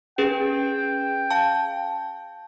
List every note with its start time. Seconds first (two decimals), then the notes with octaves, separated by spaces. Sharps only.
0.18 C#4 G#4 B4 G5
1.30 F5 A5